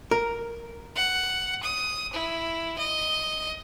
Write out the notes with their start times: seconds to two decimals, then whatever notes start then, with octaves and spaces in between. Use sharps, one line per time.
0.11 A#4
0.95 F#5
1.63 D#6
2.13 E4
2.78 D#5